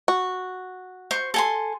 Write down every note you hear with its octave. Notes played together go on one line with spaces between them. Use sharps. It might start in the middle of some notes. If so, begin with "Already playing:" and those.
F#4
C5 C#6
A4 G#5 C6